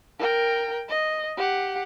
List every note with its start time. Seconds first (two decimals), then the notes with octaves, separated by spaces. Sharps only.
0.19 A#4 G5
0.89 D#5
1.37 G4 F#5